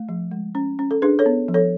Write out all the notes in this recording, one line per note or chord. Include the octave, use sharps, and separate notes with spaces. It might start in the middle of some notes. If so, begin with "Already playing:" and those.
Already playing: A3
F3
G#3
C#4
C#4
A4
D4 G#4 B4
A4 C#5
B3
F3
A4 C#5